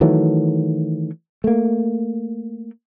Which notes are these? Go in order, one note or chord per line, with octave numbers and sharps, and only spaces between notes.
D#3 E3 F#3 A3
A3 A#3